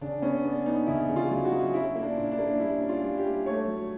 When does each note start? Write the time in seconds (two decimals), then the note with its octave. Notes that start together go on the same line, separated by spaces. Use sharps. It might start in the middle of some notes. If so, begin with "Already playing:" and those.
0.01 C#3 D4
0.22 B3 C#4
0.44 B3 D4
0.66 B3 D#4
0.87 C#3 E4
1.09 C#3
1.16 F4
1.31 F#3
1.45 F#4
1.52 F#3
1.74 C#4 E4
1.95 A#3
2.02 D4
2.17 A#2
2.31 D4
2.39 A#3
2.60 G3 E4
2.81 C#4
2.89 F4
3.03 G3
3.18 G4
3.25 G3
3.46 A3 C#5
3.67 F#3